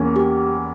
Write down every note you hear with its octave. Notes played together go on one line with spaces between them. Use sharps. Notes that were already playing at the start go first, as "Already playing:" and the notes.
Already playing: E2 E3 A#3 C#4
G4